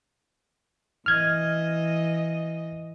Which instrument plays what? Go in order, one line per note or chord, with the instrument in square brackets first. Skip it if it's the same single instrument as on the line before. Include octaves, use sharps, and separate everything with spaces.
[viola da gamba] E3 D#5 [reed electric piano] F6 G#6